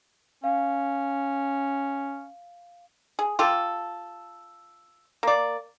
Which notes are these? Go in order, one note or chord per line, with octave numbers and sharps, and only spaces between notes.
C#4 F5
G#4
F4 G4 A4
A#3 D5